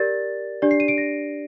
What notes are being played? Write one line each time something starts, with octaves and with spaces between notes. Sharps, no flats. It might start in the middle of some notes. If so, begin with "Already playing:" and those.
Already playing: G4 A#4 D5 A6
D4 G4 D5
C7
D#7
D7
A#6